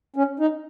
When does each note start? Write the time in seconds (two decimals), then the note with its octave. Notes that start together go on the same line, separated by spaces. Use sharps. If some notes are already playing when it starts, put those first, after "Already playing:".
0.16 C#4
0.39 D#4